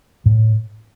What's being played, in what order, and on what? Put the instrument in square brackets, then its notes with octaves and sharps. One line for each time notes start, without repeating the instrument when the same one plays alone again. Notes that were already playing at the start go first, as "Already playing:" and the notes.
[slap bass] A2